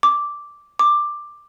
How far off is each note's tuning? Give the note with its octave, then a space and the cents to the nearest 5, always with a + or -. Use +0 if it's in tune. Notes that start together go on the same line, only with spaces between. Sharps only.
D6 -5
D6 +10